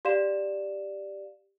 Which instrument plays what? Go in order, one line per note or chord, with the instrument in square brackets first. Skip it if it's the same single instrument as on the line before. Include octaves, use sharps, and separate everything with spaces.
[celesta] G4 D5 F5 E7